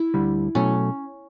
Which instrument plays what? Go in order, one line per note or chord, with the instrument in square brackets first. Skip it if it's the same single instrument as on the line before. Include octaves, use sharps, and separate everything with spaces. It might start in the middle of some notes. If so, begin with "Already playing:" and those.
Already playing: [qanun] E4
[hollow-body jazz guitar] D2 D3 G3
[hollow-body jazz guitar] B2 F#3 A3 [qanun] C#4